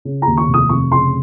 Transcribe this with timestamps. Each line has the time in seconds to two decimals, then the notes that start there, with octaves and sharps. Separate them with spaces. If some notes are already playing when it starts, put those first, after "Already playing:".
0.05 C#3
0.22 A#5
0.27 D#2
0.37 C#6
0.48 F1
0.54 D#6
0.69 F1 C#6
0.91 C#3 C6